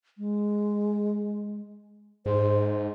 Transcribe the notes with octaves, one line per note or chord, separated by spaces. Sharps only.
G#3
G#2 C5